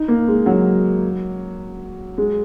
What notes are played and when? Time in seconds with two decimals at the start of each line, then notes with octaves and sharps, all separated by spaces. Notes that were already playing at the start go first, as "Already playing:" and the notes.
Already playing: D#4
0.08 A#3
0.28 G#3
0.46 F#3
2.18 G#3